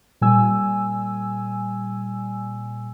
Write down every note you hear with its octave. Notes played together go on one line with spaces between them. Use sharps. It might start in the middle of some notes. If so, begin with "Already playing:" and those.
A#2 G3 G#5 E6